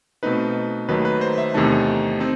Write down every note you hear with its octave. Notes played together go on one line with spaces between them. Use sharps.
B2 A3 C4 D#4 B4
D#2 D#3 F#3 A3 D#4 B4
B4
C5
E5
E2 C3 D#3 A3 D#4 A5
C4 D#4